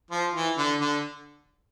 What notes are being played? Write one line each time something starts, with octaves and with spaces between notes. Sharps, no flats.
F3
E3
D3
D3